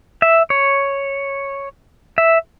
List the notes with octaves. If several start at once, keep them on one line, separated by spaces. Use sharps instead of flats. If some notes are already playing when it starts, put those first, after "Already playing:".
E5
C#5
E5